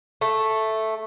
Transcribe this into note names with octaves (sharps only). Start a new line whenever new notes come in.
A3